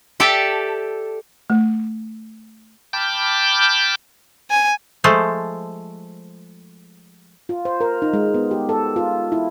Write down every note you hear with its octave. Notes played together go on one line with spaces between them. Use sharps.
G4 A4 D5 E5 G5 A5
A3
G5 A5 B5 D6 F6 G6
G#5
F3 G#3 A3 A4 C5
F4
C5
A#4
D#4
G#3
B3
G4
A4
F4
E4